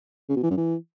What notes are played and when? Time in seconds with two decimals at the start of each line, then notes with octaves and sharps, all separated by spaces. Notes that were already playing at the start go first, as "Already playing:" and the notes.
0.29 C#3
0.36 B2
0.43 E3
0.50 F#2
0.57 E3